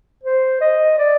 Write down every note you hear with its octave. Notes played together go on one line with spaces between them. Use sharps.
C5
D#5
D5